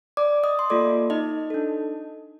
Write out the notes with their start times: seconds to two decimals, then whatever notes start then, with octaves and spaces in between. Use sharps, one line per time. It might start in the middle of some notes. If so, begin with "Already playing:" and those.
0.17 D5 D6
0.43 D#5 D#6
0.59 C6
0.70 A#3 F4 A4 D5 D6
1.10 D#4 D#5
1.50 D4 A4